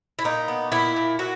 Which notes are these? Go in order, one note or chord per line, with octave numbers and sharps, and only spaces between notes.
E4
A#2 D#4
B3
A#2 E4
A#2
A#2 F#4